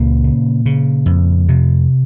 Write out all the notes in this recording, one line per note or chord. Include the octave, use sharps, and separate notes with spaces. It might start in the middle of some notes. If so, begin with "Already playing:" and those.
Already playing: C#2 A#2 A#3
C#3
C#3
F2
C3